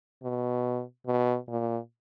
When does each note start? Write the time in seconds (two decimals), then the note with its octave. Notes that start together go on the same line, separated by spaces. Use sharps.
0.23 B2
1.07 B2
1.49 A#2